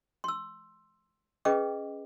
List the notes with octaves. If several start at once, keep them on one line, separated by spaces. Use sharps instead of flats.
C6 E6
C#4 G#4 B4 D#5 G5 D6